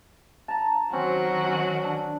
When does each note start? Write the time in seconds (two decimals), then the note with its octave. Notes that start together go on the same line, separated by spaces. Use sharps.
0.48 A5 A#5
0.93 D#3 F#3 C4 C#4 F#4
1.48 C#4
1.84 D4